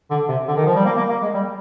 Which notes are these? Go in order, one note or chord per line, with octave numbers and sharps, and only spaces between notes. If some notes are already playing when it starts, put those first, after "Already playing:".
D3
C3
D3
D#3
F3
G3
A#3
A#3
A#3
G#3
G3